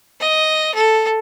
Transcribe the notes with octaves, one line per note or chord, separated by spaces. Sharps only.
D#5
A4